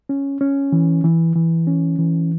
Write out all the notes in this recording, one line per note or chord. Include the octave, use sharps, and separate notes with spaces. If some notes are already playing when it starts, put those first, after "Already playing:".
C#4
C#4
E3
E3
E3
C#4
E3